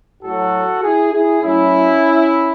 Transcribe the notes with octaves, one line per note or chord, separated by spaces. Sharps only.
A2 F#3 F#4 A4
E4 G#4
E4 G#4
A2 F#3 C#4 E4